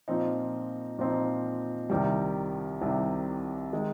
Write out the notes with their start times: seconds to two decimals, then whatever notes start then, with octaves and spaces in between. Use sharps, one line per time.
0.08 A#2 F3 C4 D#4
0.99 A#2 F3 C4 D#4
1.90 C2 C3 D#3 G3
2.81 C2 C3 D#3 G3
3.73 D#3 G#3